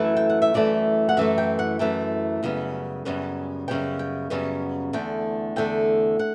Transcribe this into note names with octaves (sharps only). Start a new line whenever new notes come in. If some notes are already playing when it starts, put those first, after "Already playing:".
Already playing: F#2 E3 A3 E4
G5
F#5
E5
F#2 E3 A3 D5
F#5
F#2 E3 A3 E5
G5
F#5
F#2 E3 A3 G5
F#2 C#3 G3 B3
F#2 C#3 G3 B3
F#2 C#3 G3 B3 G5
G5
F#2 C#3 G3 B3
E2 D3 A3 G5
E2 D3 A3 G5
F#5